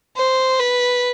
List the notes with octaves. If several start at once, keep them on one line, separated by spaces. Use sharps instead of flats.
C5
B4